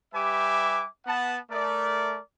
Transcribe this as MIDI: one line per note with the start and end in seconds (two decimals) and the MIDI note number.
0.14 0.85 55
0.14 0.85 67
0.14 0.85 71
0.14 0.85 76
0.14 0.85 80
0.14 0.85 86
1.06 1.37 59
1.06 1.37 78
1.06 1.37 81
1.50 2.19 57
1.50 2.19 70
1.50 2.19 74